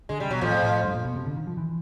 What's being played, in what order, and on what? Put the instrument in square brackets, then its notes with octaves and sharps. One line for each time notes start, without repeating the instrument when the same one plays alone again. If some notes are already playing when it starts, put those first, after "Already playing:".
[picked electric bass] D3 [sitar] G#3
[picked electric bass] C#3 [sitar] G3
[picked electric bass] B2 [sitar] F#3
[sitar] F2 F3 [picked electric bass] A2
[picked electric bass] A2
G2
A#2
B2
C3
D3
D#3
F3
E3